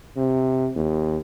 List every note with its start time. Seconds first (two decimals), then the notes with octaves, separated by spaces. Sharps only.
0.17 C3
0.76 D#2